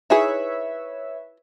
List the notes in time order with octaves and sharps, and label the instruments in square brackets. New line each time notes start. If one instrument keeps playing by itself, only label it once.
[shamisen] D#4 E4 G#4 [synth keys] B4 C#5 E5